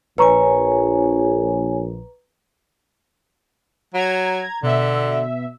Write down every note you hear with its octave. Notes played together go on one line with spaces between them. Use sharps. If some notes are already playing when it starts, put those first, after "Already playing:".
A#1 B4 C#5 G#5 A#5 C#6
F#3 A#5 G#6
B2 D3 E5